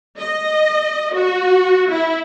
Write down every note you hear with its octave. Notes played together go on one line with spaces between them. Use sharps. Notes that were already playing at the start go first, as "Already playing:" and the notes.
D#5
F#4
E4